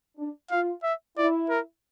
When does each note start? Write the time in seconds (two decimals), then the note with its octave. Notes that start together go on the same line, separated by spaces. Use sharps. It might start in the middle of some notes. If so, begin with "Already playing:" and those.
0.17 D4
0.51 F4 F5
0.83 E5
1.17 E4 D5
1.50 A#4